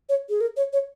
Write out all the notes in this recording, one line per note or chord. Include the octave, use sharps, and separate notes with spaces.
C#5
G#4
A#4
C#5
C#5